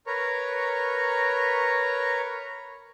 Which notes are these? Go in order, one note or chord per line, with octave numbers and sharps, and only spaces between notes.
A#4 B4 C#5 A#5 C#6